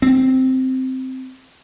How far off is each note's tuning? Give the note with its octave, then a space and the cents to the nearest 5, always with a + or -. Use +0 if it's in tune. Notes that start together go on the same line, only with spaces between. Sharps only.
C4 -5